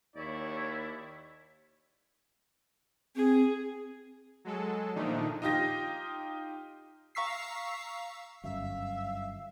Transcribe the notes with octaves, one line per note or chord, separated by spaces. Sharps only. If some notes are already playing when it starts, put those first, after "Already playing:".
D#2 E4 C#5 D5
C4 G#4
F#3 G#3 A4
A#2 D#3 F3 A3 D4 D#4
D#4 F4 G4 A#6
F5 A#5 C#6 E6 B6 C7
G1 F#2 E5 F5